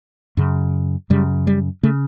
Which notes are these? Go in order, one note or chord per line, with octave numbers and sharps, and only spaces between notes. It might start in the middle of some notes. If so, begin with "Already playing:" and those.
F#2 C#3
F#2 C#3 G3
G3
C#3 A3